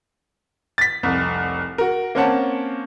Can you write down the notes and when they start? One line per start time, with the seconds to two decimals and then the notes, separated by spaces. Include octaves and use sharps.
0.78 A6 B6
1.03 F1 C2
1.78 F#4 A#4
2.15 A#3 C4 C#4 C#5 F#5 A5